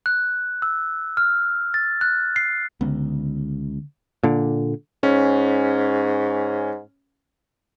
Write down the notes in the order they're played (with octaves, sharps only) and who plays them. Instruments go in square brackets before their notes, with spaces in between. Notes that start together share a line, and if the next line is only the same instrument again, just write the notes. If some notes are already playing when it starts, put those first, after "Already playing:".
[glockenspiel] F#6
E6
F6
A6
F#6
C7
[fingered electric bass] C#2 [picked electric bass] D3 B3
[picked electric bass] A#2 D3
[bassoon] G#2 [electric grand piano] C#4